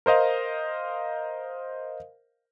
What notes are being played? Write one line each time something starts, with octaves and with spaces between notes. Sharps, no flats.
A#4 C5 D#5 F5